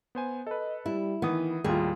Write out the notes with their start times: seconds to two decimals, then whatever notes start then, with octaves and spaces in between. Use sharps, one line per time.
0.15 B3 C5 G#5
0.47 A4 B4 D#5
0.86 G3 E4
1.22 D#3 E3 B3 E4 D#6
1.64 D#2 A2 D#3 G3 F4 G#4